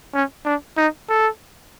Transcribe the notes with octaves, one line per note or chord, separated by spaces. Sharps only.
C#4
D4
D#4
A4